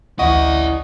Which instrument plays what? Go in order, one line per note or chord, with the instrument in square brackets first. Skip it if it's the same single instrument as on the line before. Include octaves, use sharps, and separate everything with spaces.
[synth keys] A1 D2 C#6 [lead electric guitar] E4 D5 [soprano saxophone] D#5 [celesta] F#5